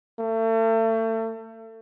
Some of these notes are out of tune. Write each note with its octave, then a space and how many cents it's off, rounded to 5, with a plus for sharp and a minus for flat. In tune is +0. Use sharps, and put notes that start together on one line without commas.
A3 +35